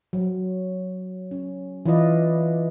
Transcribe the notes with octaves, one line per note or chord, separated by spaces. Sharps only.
F#3
C#4
E3 F4 B4 D5 D#5 F5